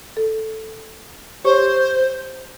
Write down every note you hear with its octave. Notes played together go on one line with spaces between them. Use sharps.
A4
G4 C5 C#5 C#6